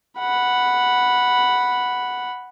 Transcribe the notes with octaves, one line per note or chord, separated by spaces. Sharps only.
F#5 B5